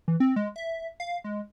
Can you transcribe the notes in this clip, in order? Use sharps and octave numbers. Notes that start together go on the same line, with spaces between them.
E3
C4
G#3
E5
F5
G#3